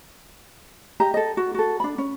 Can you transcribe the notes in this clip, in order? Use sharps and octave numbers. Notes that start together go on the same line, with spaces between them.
G4 D#5 A#5
A4 D#5
F#4
F#4 A4
D4 B5
C#4